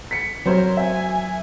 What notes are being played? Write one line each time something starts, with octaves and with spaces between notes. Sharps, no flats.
B6 C#7
F#3 C4 A#4 C5 C#5
E5 G#5